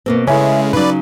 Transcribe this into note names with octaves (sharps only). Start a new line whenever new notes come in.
B2 A#3 C4
C#3 G#3 A3 C#4 E4 E5
C#3 F#3 D#4 B4 D5